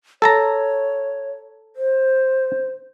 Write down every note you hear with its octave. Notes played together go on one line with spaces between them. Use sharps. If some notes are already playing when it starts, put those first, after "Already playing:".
A4 C#5 A5 A#5
C5